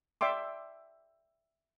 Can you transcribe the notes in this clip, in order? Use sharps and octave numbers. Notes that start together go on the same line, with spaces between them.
D5 E5 G5 C6 D6